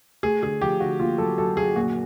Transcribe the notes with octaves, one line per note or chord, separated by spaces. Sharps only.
A3 G#4
D3 G#4
F3 G4
D3 F#4
A#3 F4
F#3 A4
F#2 A4
F#2 G#4
A#2 F#4